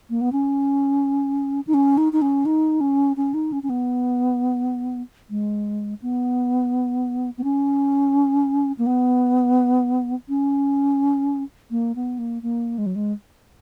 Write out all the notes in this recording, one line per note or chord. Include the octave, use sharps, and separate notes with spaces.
A#3
B3
C#4
D#4
C#4
D#4
D#4
C#4
D#4
C#4
C#4
D#4
C#4
C#4
B3
G#3
B3
B3
C#4
A#3
B3
C#4
A#3
B3
A#3
A#3
G#3
F#3
G#3